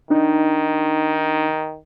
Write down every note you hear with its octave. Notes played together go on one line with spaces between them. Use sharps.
D#3 D4 D#4